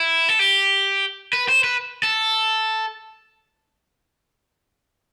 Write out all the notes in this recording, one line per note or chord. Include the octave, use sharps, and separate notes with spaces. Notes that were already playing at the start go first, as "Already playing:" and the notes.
Already playing: E4
A4
G4
B4
C5
B4
A4